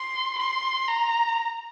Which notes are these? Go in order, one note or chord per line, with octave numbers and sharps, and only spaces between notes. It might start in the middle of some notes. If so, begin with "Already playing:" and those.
Already playing: C6
C6
A#5